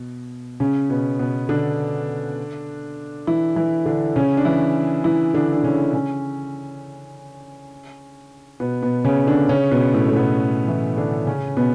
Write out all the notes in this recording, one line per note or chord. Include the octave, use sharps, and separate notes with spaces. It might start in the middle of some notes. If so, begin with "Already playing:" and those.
Already playing: B2
C#3 C#4
B2 B3
B2 B3
D3 D4
E3 E4
E3 E4
D3 D4
C#3 C#4
D4
E3 E4
E3 E4
D3 D4
D4
C#3 C#4
C#3 C#4
B2 B3
B2 B3
C#3 C#4
D3 D4
C#3 C#4
B2 B3
A2 A3
A3
B2 B3
E3 E4
D3 D4
C#3 C#4
B2 B3